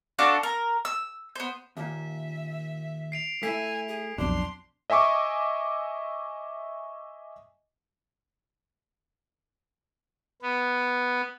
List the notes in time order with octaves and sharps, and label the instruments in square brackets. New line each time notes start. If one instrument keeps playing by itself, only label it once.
[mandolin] D4 F#4 A4 F5
A#4
E6
B3 C5
[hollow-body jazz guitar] D#2 A#2 [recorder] E5
[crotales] C7 D7 F7
[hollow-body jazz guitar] A3 E4 [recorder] G#5 [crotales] B6
[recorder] G#4
[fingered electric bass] B1 F2 B2 [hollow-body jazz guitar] D4 [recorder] C6
[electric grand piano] D#5 E5 G#5 C#6 D6
[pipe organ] B3